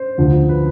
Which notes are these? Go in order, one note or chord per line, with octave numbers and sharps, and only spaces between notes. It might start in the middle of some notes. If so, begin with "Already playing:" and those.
Already playing: C5
D2 D3 F3
B4